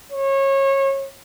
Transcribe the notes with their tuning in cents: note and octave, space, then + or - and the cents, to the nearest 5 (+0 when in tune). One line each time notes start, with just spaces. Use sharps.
C#5 -25